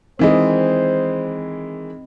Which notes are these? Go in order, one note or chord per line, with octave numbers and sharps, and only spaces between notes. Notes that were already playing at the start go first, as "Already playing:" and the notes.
D#3 E3 G#3 C4 C5 D#5